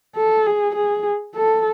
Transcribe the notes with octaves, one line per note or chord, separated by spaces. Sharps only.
A4
G#4
G#4
A4